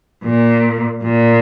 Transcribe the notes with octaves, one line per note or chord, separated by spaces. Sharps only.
A#2
A#2